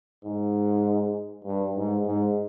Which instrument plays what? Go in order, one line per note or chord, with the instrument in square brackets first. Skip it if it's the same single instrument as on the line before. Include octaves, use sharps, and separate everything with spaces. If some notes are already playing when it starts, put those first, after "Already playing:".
[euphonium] G#2
G2
G#2
G#2